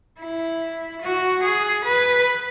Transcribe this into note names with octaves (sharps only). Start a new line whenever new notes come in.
E4
F#4
G#4
B4